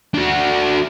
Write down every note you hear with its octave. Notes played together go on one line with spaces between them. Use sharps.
D4 F#4